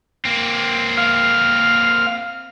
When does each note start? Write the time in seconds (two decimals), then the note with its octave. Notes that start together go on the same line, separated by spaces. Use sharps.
0.25 A#3 C4
0.97 F5